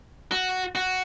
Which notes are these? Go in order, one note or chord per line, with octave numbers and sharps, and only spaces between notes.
F#4
F#4